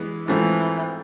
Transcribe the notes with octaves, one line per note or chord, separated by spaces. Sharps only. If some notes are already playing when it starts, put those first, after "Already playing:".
Already playing: E3 G#3 B3
G#2 E3 F3 A3 C4